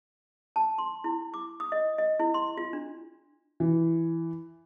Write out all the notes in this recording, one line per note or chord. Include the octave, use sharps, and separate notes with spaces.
A5
C6
E4
D6
D#6
D#5
D#5
E4
C6
F4
D4
E3